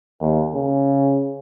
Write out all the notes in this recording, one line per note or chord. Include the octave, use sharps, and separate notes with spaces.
D#2
C#3